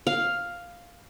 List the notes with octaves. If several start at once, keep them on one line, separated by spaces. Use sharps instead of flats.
F5